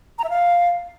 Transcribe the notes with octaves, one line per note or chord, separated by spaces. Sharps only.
A#5
E5
F5